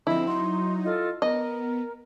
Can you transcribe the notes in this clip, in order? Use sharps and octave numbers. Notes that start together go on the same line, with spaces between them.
D3 F3 C4 E4 D#5 B5
F#3 D#4 C6
F4 A4 D#5
B3 A#4 D#5